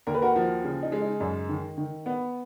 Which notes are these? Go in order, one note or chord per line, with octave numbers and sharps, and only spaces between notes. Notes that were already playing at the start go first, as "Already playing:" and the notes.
D#2 A#4
B4
F#4 A#4
F3
C#3
D#4
G#3
D#4
F#2
D#3
D#3
B3